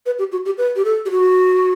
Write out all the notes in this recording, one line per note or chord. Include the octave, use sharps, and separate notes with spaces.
B4
G4
F#4
G4
B4
G4
A4
G4
F#4